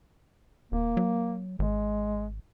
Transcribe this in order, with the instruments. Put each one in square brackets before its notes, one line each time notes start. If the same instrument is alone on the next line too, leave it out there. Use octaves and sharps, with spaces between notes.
[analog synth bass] D#1 [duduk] A#3
[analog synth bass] F#3
[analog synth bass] G#1 [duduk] G#3